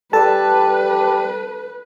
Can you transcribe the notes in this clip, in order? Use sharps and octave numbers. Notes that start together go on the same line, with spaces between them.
G3 A4 B4 A5